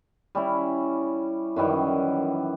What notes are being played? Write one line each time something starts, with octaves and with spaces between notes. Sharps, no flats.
G3 C#4 E4
F#2 D#3 E3 G3